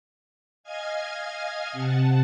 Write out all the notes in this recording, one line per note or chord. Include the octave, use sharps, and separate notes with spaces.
D#5 F5 G#5 F6 G#6
C3 F#5 A5